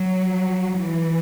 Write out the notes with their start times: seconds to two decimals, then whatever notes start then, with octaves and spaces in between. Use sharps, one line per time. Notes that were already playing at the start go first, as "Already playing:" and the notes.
Already playing: F#3
0.76 E3